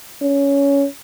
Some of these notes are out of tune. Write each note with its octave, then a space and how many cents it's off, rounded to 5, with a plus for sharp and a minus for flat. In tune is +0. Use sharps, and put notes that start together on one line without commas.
C#4 +15